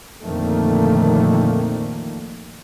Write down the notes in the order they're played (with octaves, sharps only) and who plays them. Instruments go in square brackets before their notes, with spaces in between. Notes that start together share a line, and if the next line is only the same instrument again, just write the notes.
[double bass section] A#1 F2 D3 D#3 A3 A#3